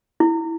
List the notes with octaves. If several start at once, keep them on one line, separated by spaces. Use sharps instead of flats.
E4